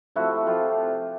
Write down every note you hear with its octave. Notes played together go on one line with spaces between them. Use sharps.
C3 F3 A3 E4 F#4
C3 F3 A3 F4 G4